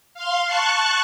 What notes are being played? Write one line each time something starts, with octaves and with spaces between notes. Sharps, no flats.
F5 C6
A5 C#6 F#6